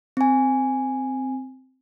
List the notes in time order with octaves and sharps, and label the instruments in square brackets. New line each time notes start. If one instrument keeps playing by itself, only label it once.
[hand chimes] C4 G#5